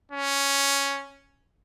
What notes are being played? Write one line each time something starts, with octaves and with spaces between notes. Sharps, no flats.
C#4